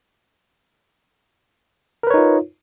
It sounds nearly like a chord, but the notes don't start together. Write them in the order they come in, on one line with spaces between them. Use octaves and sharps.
A#4 B4 C#5 D#4 F4